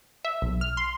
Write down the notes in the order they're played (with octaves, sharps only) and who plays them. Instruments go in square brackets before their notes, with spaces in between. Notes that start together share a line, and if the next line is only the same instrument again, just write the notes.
[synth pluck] E5
B1
F6
C6